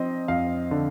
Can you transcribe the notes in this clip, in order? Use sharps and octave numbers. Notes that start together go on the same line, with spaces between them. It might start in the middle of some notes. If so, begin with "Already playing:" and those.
Already playing: F3 C4 D#5
F2 F5
D3